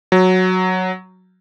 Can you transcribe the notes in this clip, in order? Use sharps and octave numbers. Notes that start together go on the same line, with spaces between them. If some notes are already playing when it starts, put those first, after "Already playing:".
F#3